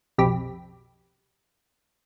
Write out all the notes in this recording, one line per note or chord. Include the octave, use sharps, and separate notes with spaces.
B1 F2 C3 G4 B5